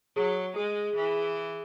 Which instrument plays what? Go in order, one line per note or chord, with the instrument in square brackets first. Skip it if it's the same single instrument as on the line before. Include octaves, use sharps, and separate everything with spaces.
[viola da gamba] F#3 [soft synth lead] G#4
[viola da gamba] G#3 [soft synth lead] G#4
[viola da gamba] E3